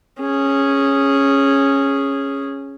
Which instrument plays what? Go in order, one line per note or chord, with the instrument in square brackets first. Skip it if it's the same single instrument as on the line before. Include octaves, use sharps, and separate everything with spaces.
[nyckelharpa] C#4 G#4